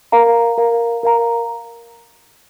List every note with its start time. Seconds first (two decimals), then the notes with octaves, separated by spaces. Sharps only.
0.12 A#4 F5 A#5
0.58 A#4 F5 A#5
1.03 A#4 F5 A#5